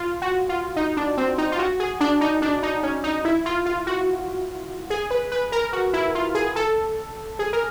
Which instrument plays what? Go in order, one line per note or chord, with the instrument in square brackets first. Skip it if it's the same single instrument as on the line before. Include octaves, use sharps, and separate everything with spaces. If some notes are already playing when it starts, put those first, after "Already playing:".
Already playing: [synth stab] F4
F#4
F4
D#4
D4
C4
D#4
F4
F#4
G#4
D4
D#4
D4
D#4
C#4
D#4
E4
F4
F4
F#4
G#4
B4
B4
A#4
F#4
E4
F4
G#4
A4
G#4
A#4